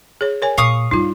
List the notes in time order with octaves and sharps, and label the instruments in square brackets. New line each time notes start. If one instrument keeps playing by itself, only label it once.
[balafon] G#4 C#5
A#4 C#5 G#5
[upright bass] A#2 [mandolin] F5 C#6 D#6
[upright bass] G2 G3 [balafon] D#4 F4